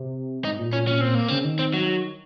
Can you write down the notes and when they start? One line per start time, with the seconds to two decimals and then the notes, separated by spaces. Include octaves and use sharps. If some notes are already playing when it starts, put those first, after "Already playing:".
Already playing: C3
0.44 G#2 D#4
0.59 A#2
0.73 A#2 C#4
0.87 A#2 C#4
1.01 A#2 C4
1.15 A#3
1.28 C#3 C4
1.44 D#3
1.59 C4
1.74 F#3